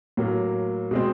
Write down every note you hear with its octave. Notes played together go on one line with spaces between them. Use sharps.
A2 F#3 A#3
B2 G#3 C4